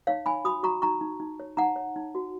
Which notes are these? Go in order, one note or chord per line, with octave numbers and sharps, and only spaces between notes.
D#4 C#5 F5
D#4 G#5 B5
F#4 B5 D#6
F#4 A#5 C#6
D#4 A#5 C#6
D#4
D#4
C#5
D#4 F#5 A#5
C#5
D#4
F#4